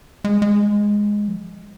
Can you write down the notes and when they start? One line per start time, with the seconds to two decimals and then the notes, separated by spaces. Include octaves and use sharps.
0.25 G#3
0.42 G#3
1.28 F3